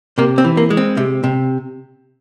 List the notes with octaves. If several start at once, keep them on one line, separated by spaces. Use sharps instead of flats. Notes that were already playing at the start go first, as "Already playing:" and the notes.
C3 A#3
C4
E3
A#3
G#3
C4
C3
C3